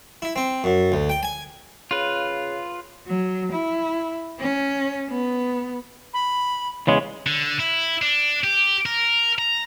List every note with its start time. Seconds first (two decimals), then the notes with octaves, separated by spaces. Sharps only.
0.22 E4
0.36 C4
0.64 F#2
0.92 D2
1.10 G5
1.23 G#5
1.91 C#3 F4 B4
3.07 F#3
3.52 E4
4.39 C#4
5.09 B3
6.14 B5
6.87 E2 C#3 G#3 C#5
7.26 D3
7.59 E4
8.02 D4
8.44 G4
8.86 A#4
9.39 A#5